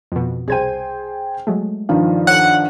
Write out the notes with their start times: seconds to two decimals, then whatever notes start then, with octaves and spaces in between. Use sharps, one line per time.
0.12 F2 B2
0.48 C2 G#4 C5 G5 G#6 D#7
1.47 F#3 G#3 A3
1.89 G2 D#3 F3
2.27 A4 C#5 F#5